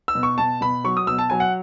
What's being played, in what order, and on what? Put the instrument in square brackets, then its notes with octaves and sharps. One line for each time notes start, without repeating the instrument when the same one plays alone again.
[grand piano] E6
B2
C#6
B2 A5
B2 B5
F#3 C#6
D#6
B2 E6
A5
F#3 G#5
F#5